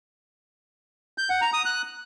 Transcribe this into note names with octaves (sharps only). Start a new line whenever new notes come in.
G6
F#5
A#5
D#6
F#6